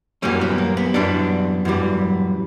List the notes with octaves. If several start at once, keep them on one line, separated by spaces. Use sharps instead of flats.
F#2 E3 G3 A#3 C#4
B3
A#3
B3
F#2 E3 G3 B3 D4
F#2 E3 G3